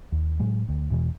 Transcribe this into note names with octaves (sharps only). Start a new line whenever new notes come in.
D#2
A2 F#3 G#3
D2
E2 B2 E3